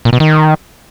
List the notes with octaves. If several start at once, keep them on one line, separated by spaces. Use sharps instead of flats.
A#2
B2
D#3